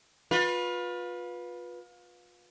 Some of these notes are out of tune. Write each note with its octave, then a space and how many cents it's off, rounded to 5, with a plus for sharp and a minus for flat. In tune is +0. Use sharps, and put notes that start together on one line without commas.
F4 +30 B4 -10